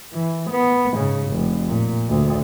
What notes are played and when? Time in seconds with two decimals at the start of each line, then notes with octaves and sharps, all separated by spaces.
0.13 E3
0.51 B3
0.97 G#2 C#3
1.29 F1
1.68 A#2
2.09 D2